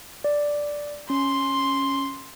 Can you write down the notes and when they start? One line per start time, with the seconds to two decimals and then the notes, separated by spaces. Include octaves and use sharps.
0.24 D5
1.10 C#4 C6